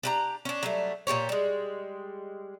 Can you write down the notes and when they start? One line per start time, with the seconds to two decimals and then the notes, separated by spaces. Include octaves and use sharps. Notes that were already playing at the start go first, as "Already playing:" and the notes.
0.03 D4 G4 A#5
0.45 C#4 D4
0.63 F#3 G3 A3
1.07 A#2 D#3 G4 C#5
1.29 G3 G#3